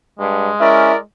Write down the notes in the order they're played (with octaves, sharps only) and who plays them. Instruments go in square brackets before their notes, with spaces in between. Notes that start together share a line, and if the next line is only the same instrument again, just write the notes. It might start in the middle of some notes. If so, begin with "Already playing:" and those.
[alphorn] G2 [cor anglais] G#3
[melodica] C#4 [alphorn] E4 [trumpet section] A#4 D5 E5